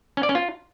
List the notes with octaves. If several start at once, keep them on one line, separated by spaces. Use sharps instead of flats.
C#4
D5
C#4
F4